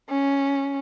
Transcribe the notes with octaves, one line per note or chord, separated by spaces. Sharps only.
C#4